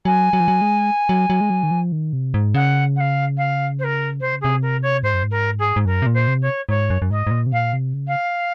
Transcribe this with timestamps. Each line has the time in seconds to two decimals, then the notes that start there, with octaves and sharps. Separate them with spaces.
0.05 F#3 G#5
0.33 F#3
0.40 F3
0.48 F#3
0.61 G#3
1.09 F#3
1.30 F#3
1.41 G#3
1.50 F#3
1.63 D#3
1.71 F3
1.92 D#3
2.13 C3
2.34 G#2
2.54 C#3 F#5
2.96 F#5
3.00 F5
3.37 F5
3.79 C5
3.84 A#4
4.20 C3 C5
4.33 C#3
4.41 C3 G#4
4.62 A#4
4.82 C#5
5.03 G#2 C5
5.14 F#2
5.23 G#2
5.31 A#4
5.59 G#4
5.76 G#2
5.85 F#2 A#4
6.02 C3
6.06 A#2
6.14 C5
6.28 C3
6.42 C#5
6.69 G#2 C#5
6.90 F#2
7.02 F#2
7.10 G#2 D#5
7.27 G#2
7.31 A#2
7.46 C3
7.52 A#2 F5
7.73 C3
7.94 C#3
8.07 F5